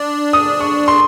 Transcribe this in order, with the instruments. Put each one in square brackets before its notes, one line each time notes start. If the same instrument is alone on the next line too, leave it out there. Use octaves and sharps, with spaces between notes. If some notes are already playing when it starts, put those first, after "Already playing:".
Already playing: [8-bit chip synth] D4 [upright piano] D6
[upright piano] D#6
C#6
C6